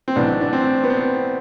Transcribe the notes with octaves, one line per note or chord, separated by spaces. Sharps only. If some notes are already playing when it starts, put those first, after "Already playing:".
C4
B1 A2 E3 D4
D4
C4
B3
C4